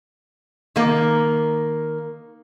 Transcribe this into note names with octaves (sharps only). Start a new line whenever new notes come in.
D#3 A#3